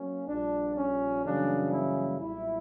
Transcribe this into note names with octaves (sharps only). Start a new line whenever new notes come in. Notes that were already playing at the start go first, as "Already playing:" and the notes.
Already playing: F#3 A#3 C#4
A#1 A#2 G3 D4
C#4
F#2 C#3 E3 G3 A#3 D4
E4
B1 A#2 G3 E4